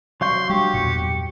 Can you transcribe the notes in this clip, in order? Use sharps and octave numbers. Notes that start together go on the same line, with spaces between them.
F#3 F5 C6 C#6 G6
G3 D4 G4 C#6
E2 G2 A#2 C#7